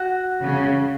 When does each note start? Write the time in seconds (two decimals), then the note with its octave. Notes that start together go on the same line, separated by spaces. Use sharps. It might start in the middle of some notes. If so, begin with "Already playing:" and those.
Already playing: F#4 F#5
0.42 C#3